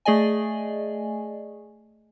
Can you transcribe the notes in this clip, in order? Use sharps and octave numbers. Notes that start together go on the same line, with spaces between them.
A3 G#4 D5 D#5 G#5